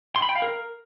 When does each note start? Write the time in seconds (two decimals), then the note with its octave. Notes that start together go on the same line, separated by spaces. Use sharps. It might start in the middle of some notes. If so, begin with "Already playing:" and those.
0.16 C6
0.22 B5
0.29 G5
0.36 F5
0.42 A#4